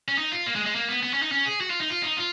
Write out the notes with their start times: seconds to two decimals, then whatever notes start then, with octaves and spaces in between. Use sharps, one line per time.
0.08 C#4
0.18 D#4
0.32 F4
0.46 A#3
0.55 G#3
0.66 G#3
0.75 A#3
0.89 B3
1.03 B3
1.13 C#4
1.22 D#4
1.32 C#4
1.46 G#4
1.61 F#4
1.70 F4
1.80 D#4
1.90 F4
2.03 D#4
2.17 F4